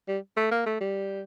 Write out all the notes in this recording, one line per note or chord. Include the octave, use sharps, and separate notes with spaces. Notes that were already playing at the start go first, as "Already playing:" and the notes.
G3
A3
A#3
A3
G3